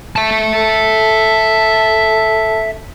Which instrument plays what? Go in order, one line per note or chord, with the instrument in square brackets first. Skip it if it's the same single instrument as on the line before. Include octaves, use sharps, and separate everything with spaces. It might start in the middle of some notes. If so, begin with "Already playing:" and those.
[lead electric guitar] E5 A5
[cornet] A4